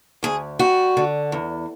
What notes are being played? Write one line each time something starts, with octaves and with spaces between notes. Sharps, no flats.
D2 G#4
G3 F#4
D3
E2